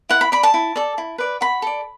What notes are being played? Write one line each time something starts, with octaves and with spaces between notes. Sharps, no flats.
E4 F#5
B5
D5 B5
A5
E4
A4 D5
E4
B4 D5
F#4 B5
A4 D5